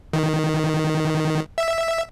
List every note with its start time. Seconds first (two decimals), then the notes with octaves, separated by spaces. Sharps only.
0.13 D#3
1.58 E5